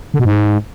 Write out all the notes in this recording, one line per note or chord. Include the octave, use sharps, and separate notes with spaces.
D3
B2
G#2